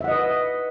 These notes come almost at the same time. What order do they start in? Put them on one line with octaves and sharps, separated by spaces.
E5 F#5 D#5 B4